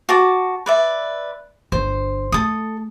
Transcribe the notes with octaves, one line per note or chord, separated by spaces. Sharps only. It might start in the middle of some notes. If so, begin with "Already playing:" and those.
F#4 A5 D6
B4 D5 E5
G1 D3 C5
A3 A4 D#6